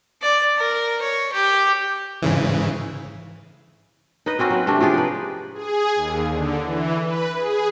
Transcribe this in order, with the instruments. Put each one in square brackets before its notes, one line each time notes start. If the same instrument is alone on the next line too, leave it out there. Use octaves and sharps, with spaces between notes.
[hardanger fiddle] D5
A#4
C#5
G4
[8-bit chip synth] G#2 C#3 E3
[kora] D#4 B4 D#5
A#3 C4 C#4 F#4
F#3 B4
C3 A3 C#4 D4
F3 G4 G#4 D5
D#4 B4
[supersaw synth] G#4
D#2
D3
E3
B4
G#4